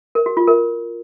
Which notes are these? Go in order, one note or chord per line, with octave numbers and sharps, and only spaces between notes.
A#4
F#4
F4
A#4